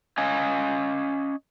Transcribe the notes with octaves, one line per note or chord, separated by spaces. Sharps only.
C#4 D#5 F5 G#5